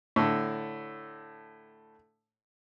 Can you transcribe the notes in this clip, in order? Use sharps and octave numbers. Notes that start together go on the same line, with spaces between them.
A2 D3